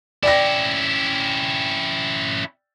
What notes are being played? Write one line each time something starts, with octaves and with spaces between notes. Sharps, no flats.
C#4 E4 D5 G5 A#6